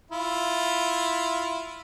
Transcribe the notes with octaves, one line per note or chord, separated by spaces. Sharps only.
E4 F4